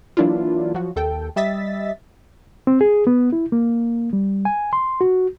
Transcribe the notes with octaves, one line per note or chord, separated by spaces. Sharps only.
E3 F#3 A#3 D4 E4 F4
F3 F#3 F#4
D#2 A4 G5
G3 D#5 E5 A6 B6
C4
G#4
B3
E4
A#3
G3
G#5
C6
F#4